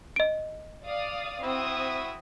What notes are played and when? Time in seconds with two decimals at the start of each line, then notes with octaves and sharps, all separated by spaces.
0.16 D#5 D7
0.85 D5 F5 D#6
1.43 C4 E4 F#4 E5 D#6